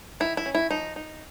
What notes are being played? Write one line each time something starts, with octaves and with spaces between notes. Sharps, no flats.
D#3 E4
E4
C#4
E4
F3 D#4
D#4